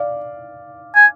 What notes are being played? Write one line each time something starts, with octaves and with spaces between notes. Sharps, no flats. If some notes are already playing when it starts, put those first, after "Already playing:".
Already playing: D5 F5
G#5